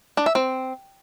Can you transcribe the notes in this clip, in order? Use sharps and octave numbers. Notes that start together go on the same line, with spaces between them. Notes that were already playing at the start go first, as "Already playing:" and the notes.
D4
E5
C4